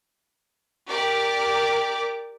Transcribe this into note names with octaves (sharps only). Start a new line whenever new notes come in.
G4 A#4 D5 D6